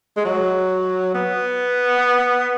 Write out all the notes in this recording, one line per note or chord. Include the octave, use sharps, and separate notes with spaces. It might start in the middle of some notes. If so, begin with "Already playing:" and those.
G#3
F#3
B3